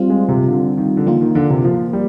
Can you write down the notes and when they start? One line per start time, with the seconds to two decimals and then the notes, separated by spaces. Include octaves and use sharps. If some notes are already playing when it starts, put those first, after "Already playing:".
Already playing: G3 C4 F4
0.10 G#3
0.29 C3
0.49 D3
0.77 D#3
0.97 D3
1.06 D#3 F3 A#3 F4 A#4
1.21 D#3
1.35 D3
1.50 C3
1.64 F3
1.93 G3